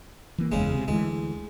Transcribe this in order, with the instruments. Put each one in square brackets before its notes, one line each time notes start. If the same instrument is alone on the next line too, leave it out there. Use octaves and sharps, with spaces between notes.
[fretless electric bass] E3 A#3
[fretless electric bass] F#1 E2 [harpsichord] C#3 G#3
[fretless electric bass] C3
[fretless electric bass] D2 D#3 E3 [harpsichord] G#3